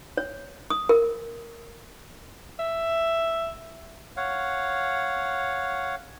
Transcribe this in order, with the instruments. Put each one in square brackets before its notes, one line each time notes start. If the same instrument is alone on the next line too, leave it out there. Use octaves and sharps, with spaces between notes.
[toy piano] C#5
D#6
A#4
[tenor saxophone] E5
[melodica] C#5 F5 F#5